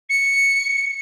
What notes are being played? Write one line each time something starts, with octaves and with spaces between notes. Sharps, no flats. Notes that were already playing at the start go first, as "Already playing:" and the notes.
C#7